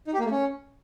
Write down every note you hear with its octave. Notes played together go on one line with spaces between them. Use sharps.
D#4
G4
A#3
A3
C#4